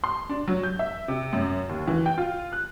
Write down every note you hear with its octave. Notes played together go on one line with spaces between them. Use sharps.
C6
D4
F#3
G6
E5
C3
F#2
D#2
E3
G5
F4
F#6